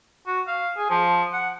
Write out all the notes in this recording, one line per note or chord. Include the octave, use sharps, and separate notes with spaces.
F#4
F5
G#4
F3
F#5